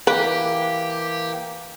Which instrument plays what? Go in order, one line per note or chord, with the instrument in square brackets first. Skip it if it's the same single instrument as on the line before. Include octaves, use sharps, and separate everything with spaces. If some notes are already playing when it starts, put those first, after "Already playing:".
[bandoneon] E3 A#3 [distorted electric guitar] G4 [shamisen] B4 [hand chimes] F5